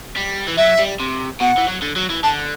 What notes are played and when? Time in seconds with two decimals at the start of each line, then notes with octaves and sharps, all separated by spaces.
0.16 G3
0.48 E3
0.57 F#3 E5
0.79 G3
1.00 C3
1.40 B2 F#5
1.57 E3
1.68 F#3
1.82 D3
1.96 F#3
2.10 E3
2.23 D3 A5